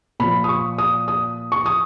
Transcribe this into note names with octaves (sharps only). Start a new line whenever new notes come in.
A#2 F3 B5
D#6
C#6
D#6
D#6
C#6
D#6